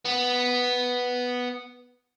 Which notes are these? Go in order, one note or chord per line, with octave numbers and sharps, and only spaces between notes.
B3